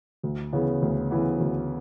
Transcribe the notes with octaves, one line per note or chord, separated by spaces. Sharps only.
D2
C#3 E3 B3
D2
C#3 E3 B3
D2